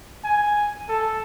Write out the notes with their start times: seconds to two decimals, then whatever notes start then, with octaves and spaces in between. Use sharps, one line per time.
0.24 G#5
0.89 A4